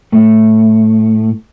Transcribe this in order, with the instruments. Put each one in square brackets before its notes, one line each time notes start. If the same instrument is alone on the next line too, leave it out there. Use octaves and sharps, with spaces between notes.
[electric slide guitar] A2 A3